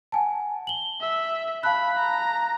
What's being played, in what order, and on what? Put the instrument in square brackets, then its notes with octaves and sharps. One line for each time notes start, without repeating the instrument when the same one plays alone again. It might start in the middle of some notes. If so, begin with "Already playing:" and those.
[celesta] F#5 G#5 A5
F#7 G7
[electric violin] E5
[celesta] F5 A5 F#6 [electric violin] B5
[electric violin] A#5